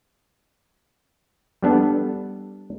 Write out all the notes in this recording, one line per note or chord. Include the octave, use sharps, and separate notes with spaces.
G3 B3 D4 A4